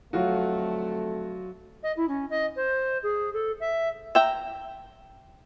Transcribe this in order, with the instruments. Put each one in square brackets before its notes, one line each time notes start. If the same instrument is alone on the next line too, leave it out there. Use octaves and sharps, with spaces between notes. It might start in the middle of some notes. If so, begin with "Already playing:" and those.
[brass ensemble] F2 D3 A3 [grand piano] F#3 F4 F#4
[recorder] D#5
E4
C#4
D#5
C5
G#4
A4
E5
[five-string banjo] E5 G5 A#5